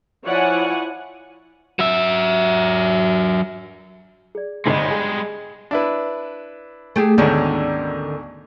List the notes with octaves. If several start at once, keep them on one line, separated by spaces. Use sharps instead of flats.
F3 E4 C#5 D5 F#5 G#5
F#3 E5
G#4 D5
G1 G#2 G3 G#3 D#5 B5 C6
G#4
D4 E4 B4
A3 G4 G#4
D2 G#2 B2 D3 D#3 C#4